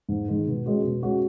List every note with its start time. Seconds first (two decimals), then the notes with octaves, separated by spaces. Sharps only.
0.09 G#2
0.28 D#3 G#3
0.47 B2
0.66 G#3 C#4 F#4
0.84 B2
1.02 G#3 C#4 F#4